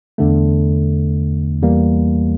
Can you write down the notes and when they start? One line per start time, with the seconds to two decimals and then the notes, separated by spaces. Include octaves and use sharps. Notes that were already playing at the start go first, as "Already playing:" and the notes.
0.18 E2 D3 A3
1.62 E2 E3 G3 A#3